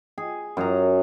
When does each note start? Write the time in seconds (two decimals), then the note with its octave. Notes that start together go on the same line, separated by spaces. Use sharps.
0.18 G#4
0.57 F#2 G#4 A#5